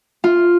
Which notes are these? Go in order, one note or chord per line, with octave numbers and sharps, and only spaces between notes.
F4